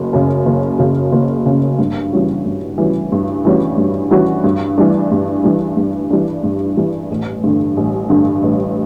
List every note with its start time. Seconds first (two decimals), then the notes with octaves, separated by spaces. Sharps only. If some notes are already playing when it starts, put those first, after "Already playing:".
Already playing: F#1 F#2
0.13 F#2 C#3
0.46 F#1
0.79 F#2 C#3
1.12 F#1
1.46 F#2 C#3
1.79 G2
2.12 E3 G3 C#4 F#4
2.45 G2
2.78 E3 G3 C#4 F#4
3.12 G2
3.45 E3 G3 C#4 F#4
3.78 G2
4.11 E3 G3 C#4 F#4
4.44 G2
4.78 E3 G3 D4
5.11 G2
5.44 E3 G3 D4
5.77 G2
6.10 E3 G3 D4
6.44 G2
6.77 E3 G3 D4
7.11 A1
7.44 G2 D3
7.77 A1
8.10 G2 D3
8.43 A1